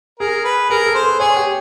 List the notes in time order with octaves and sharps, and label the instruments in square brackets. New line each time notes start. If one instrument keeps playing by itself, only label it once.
[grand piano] G#4 [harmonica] A#4
[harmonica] B4
[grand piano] G#4 [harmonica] A#4
[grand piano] A4
[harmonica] C5
[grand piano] B4
[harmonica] G#4 [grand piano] C#5
[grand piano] G4